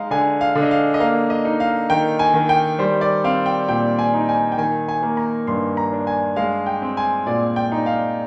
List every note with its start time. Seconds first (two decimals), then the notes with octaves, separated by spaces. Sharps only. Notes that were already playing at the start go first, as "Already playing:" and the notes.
Already playing: G#3 D#4 D#5 F5
0.11 D3 G#5
0.41 F5
0.55 D3
0.63 D#5
0.71 F5
0.94 D#5
1.00 A#3 F5
1.30 D#5
1.45 D#4
1.60 F5
1.90 D#3 G5
2.19 G#5
2.34 D#3
2.49 G5
2.79 G3 C5
3.01 D5
3.24 C4 F5
3.46 G5
3.68 A#2 G5
3.99 G#5
4.14 D#4
4.29 G#5
4.52 G5
4.58 D#3 G#5
4.88 G#5
5.03 A#3
5.17 A#5
5.47 G2 C6
5.77 A#5
5.93 D4
6.07 G#5
6.36 G#3 F5
6.66 G5
6.82 C4
6.97 G#5
7.26 A#2 D5
7.56 G5
7.72 D#4
7.86 F5